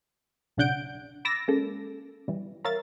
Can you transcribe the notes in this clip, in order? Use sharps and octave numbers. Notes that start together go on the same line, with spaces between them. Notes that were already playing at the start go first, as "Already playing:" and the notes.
B1 C#3 D4 F#5 G6 D7
B5 D6 E6 A6 A#6
G#3 A#3 C#4 A4
E3 G3
A#4 C#5 E5 F5 A6